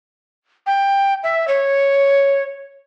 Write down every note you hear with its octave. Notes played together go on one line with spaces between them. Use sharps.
G5
E5
C#5